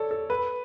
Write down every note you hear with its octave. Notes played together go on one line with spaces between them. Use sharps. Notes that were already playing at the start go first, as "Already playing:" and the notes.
Already playing: A4 C#5 D5
A4
B4